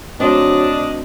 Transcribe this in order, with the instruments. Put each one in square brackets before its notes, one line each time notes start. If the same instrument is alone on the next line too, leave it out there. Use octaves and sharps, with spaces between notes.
[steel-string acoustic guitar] D2 C4 [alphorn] F#3 [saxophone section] D4 D#5